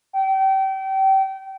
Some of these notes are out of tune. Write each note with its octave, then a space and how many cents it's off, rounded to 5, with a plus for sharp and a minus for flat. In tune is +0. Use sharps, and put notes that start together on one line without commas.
G5 -30